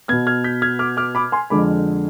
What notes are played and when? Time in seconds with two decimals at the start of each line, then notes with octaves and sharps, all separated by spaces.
0.08 B3 F6 G#6
0.12 B2
0.27 F6 G#6
0.44 G6 B6
0.62 F6 G#6
0.79 D6 F6
0.97 D6 F6
1.15 B5 D6
1.32 G#5 C6
1.50 F2 D3 G#3 B5 D6